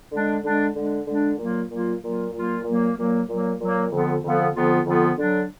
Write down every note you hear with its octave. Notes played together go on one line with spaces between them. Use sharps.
D3 G#3 D4
D3 G#3 D4
D3 G#3 D4
D3 G#3 D4
A#2 F#3 A#3 F4
A#2 F#3 A#3 F4
A#2 F#3 A#3 F4
A#2 F#3 A#3 F4
A#2 F#3 A#3
A#2 F#3 A#3
A#2 F#3 A#3
A#2 F#3 A#3
F2 D3 F3 B3 F4
F2 D3 F3 B3 F4
F2 D3 F3 B3 F4
F2 D3 F3 B3 F4
D3 F#3 D4